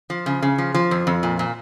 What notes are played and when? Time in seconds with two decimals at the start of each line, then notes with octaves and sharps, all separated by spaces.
0.10 F3
0.26 C#3
0.42 C#3
0.58 F3
0.75 F3
0.91 F2
1.07 F2
1.23 A#2
1.39 A#2